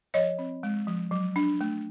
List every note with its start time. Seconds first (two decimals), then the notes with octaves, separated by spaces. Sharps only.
0.14 F3 C#5 D#5
0.39 C4
0.63 G#3
0.87 F3
1.11 F#3
1.36 D4
1.61 A3